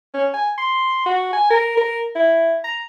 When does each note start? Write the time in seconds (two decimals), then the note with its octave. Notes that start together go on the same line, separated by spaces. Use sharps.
0.14 C#4
0.34 G#5
0.58 C6
1.06 F#4
1.33 G#5
1.50 A#4
1.77 A#4
2.16 E4
2.64 A#5